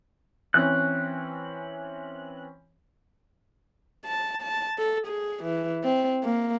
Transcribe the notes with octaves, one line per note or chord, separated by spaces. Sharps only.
E3 C4 C#4 F#6
A5
A5
A4
G#4
E3
C4
A#3